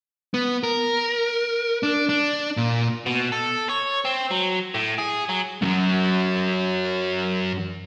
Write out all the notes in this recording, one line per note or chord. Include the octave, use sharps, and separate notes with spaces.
B3
A#4
D4
D4
A#2
B2
A4
C#5
C4
F#3
A2
G#4
F#3
F#2 F#3